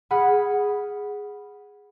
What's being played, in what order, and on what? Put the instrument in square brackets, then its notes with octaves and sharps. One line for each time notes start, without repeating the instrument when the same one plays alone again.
[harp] G#4 F#5 B5 F6